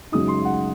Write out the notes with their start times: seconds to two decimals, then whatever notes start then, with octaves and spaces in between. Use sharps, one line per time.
0.12 F#2 C#3 G#3 D#4 D#6
0.28 C6
0.45 F#5